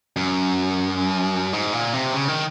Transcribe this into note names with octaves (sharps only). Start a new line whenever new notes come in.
F#2
G#2
A#2
C3
C#3
D#3